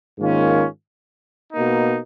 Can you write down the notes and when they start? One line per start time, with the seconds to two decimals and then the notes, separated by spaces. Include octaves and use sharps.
0.18 G#2 D#3 A#3 C#4 F4
1.52 B2 A#3 D#4